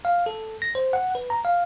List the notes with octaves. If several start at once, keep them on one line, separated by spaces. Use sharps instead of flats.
F5
A4
A#6
C5
F#5
B4
A#5
F5